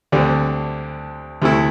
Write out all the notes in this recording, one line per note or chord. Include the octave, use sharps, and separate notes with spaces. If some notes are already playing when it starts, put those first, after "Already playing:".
D2 D3 G3 C4
D2 C3 A3 E4